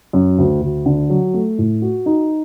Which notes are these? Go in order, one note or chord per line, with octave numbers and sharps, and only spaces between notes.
F#2
D2
D2
D3
F#3
A3
A2
F#4
D#4